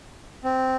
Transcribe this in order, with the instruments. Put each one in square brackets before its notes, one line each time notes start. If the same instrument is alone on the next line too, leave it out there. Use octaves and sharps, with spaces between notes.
[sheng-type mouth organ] C4